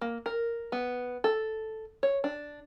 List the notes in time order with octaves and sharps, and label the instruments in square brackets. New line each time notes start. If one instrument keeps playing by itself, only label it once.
[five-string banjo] A#3
A#4
B3
A4
C#5
D4